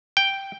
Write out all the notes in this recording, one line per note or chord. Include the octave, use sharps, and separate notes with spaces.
G5